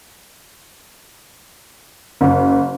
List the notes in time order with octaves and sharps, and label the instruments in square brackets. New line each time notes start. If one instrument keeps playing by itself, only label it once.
[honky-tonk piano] F#1